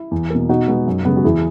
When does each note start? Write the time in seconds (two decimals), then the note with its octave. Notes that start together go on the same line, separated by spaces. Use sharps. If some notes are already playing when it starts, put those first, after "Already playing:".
Already playing: E4
0.11 E2
0.30 B2 A#3
0.49 B2 D#4 F#4
0.68 G#3 B3
0.87 F#2
1.05 C#3 G#3 B3
1.17 F#4
1.25 E2 E4 G#4